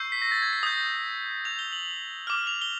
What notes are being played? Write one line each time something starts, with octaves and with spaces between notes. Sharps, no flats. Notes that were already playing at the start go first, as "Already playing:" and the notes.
Already playing: C#6 E6 G6 C7
B6
A#6
A6
G#6
B6
D#6 G6
D#6 G6 F7
G7
F#7
D6 F6
F7
G7